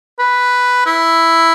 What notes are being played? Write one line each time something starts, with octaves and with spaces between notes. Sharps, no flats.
B4
E4